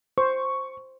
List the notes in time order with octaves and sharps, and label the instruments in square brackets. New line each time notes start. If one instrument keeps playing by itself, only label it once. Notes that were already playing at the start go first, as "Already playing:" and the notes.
[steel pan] C5 [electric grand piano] C#6